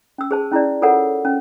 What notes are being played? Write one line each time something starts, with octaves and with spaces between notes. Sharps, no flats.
C#4 E6
G#4 C5 A5
C#4 E4 G#4 D5
F4 A4 A#4 C#5 F#5
C#4